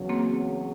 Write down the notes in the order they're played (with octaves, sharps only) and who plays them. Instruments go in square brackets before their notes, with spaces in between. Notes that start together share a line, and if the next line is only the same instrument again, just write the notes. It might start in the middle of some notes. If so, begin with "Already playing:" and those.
Already playing: [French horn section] E2 C#3 F#3
[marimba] A#3 C4